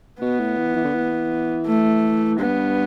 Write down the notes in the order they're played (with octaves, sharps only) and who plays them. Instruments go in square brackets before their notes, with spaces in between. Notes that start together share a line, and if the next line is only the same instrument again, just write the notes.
[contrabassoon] B2 [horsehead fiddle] B3
[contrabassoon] A2
E3
E3
D3
E3
[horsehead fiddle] A3
[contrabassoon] G2 [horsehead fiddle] B3